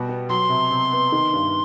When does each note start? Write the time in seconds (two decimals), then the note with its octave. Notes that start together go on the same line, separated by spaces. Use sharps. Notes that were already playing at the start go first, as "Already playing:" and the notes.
Already playing: B2 G3 F#4
0.09 B3
0.29 F#3 C6
0.49 C3
0.71 C3
0.92 B3
1.12 D#3
1.33 G2